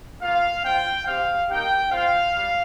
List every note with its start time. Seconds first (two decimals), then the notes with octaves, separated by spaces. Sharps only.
0.22 A#3 F4 F5
0.64 C4 F4 G5
1.06 C4 G4 F5
1.49 A#3 D#4 G4 G5
1.91 C4 F4 F5
2.33 G3